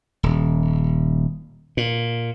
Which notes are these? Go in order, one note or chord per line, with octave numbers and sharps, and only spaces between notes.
D#1
A#2